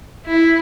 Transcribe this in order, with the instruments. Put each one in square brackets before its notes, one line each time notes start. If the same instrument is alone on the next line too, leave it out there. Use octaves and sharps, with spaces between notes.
[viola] E4